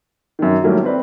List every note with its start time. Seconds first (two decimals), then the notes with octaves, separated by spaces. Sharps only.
0.39 F#2 D#3
0.63 A2 D#3 F#3 G3 A3 A#3
0.84 C4 B4 D5